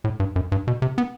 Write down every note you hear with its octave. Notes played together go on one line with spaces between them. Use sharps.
A2
G2
F#2
G2
B2
C3
B3